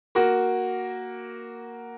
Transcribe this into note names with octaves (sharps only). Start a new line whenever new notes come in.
A#3 F#4